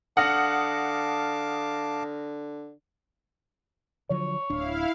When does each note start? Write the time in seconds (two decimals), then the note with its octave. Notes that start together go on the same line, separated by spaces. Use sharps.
0.17 D3 F5 F#5 A5 D6 D#6 F6 A#6
4.10 D3 F3 F#3 C#5
4.50 D1 D4 E4 F5